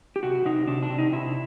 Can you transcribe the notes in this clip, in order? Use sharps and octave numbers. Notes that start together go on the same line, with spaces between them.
G4
C3 F#4
C3 D#4
C3 D4
D4
C3
D#4
C3 E4